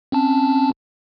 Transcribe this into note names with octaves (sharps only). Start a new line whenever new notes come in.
C4 C#4 A5